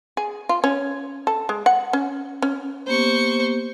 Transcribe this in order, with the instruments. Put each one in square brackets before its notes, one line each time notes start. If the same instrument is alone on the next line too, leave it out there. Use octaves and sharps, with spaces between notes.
[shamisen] G#4
F4
C#4
A4
G#3
F#5
C#4
C#4
[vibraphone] A#3 B3 G4 [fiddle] C5 C#6